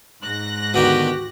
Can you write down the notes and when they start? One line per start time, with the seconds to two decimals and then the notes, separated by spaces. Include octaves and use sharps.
0.24 G#2 F#6 A#6
0.74 B2 D3 D#3 F#4 G4